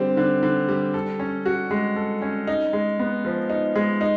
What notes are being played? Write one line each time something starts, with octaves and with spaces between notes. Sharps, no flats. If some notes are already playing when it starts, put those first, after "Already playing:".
Already playing: D3 G3 C4
D3
D3
G3
A4
C#4
F#4
G#3
A4
C#4
D#4
G#3
B3
F3
D#4
G#3
D#4